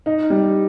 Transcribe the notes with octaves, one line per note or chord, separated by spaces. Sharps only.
D#4
G3